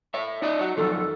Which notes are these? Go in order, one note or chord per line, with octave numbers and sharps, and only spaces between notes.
C#5 E5
D#4 D5 D#5
F#4 C#5
F#2 D#3 F3 A4